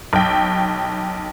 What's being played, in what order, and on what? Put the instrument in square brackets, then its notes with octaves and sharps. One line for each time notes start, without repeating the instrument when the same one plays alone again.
[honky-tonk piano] B1 G5